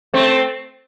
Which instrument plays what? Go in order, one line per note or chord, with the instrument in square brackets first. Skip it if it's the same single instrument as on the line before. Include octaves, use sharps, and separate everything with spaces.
[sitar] A3 C4